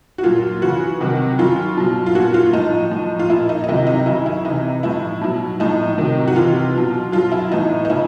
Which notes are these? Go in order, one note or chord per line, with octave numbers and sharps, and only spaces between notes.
F#4
A#2 F#3 F4
C#3 E3 F#4
C3 D#3 F#3
C#3 F#3 F4
B2 F#3
F4
A#2 F#3 F#4
F4
A2 F3 D#4
A2 F3
F4
A#2 F3 E4
D#4
D#4
C3 D#3 F#3 E4
D#4
C#3 F#3 E4
E4
C3 E3 D#4
A2 F3 E4
B2 F#3
A2 F3 D#4
C3 D#3 F#3
F#4
C3 E3 F4
B2 F#3
B2 F#3 F4
E4
A2 E3 D#4
D#4
C#3 F3 E4